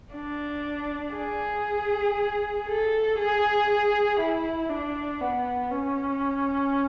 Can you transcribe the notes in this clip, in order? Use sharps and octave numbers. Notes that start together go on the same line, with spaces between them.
D4
G#4
A4
G#4
E4
D4
B3
C#4